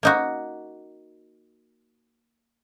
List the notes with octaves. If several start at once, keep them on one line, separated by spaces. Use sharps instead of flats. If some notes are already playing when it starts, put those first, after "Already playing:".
A#3 D#4 F#4